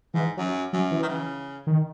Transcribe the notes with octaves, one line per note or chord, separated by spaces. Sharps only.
G#2 E3
F#2 F#3
F#2 F#3
E3
D#3
C#3
D#3